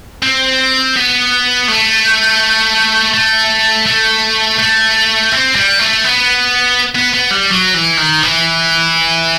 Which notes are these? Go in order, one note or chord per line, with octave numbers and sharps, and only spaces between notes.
C4
B3
A3
A3
A3
A3
C4
G3
A3
B3
B3
B3
G3
F#3
E3
D#3
E3